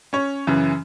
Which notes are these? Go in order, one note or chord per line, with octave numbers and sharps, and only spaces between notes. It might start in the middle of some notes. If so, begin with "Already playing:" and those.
C#4 C#5
F#2 C#3 E3